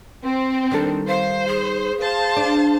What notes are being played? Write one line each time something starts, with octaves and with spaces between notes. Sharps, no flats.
C4
D#3 G3 D4 A4
C5 F5
G#4
C5 F5 A5
D4